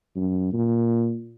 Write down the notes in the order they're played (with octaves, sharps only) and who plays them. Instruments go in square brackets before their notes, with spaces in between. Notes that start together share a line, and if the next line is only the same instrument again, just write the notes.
[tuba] F#2
A#2